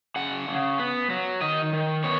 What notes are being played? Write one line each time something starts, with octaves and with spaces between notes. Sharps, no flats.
C#3 F#5
C#3
B3
F#3
D#3 D#5
D#3
B3 C#5